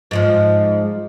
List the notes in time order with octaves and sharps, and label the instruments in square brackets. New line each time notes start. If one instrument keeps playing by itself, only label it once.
[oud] G#2 F3 G#3